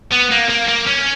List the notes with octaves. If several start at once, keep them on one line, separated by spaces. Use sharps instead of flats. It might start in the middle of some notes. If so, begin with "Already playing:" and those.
B3
A#3
A#3
A#3
C#4